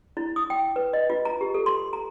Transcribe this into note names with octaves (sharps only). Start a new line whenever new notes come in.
E4
D#6
G5
B4
D#5
F4
A#5
G4
A4
C6
A#5